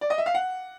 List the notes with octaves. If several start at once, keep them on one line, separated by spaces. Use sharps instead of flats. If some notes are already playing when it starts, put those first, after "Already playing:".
D5
D#5
E5
F5
F#5